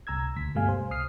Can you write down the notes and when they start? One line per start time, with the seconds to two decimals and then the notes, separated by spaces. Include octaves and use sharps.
0.07 C2 A#5 E6 G#6
0.36 D2 B6
0.55 G2 B2 G3 A3 F5 G#5
0.69 C5
0.91 C2 D#6 F6 C7